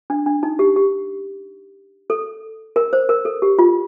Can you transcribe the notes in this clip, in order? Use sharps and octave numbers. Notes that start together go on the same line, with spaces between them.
D4
D4
D#4
G4
G4
A4
A#4
C5
A#4
A4
G4
F4